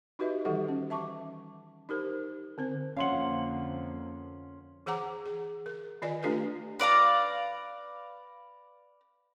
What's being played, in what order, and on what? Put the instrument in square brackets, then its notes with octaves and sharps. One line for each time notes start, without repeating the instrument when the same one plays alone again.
[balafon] D#4 F#4 G4 B4 D#5 E5
D#3 E3 G3 G4 A4 F#5
C#4
E5 A5 C#6 D6
D#4 G4 A#4 C5
D3 C4 C5
[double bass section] F2 D3 A#3 [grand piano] C#4 C6 F#7 [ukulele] F5 F#5
[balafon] E3 G#4 C5 F#5 A#5 D6
G#4
A#4
D#3 F4 D5 D#5 G#5
A3 D4 F4 G4 A4 B4
[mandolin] B4 D5 F5 A#5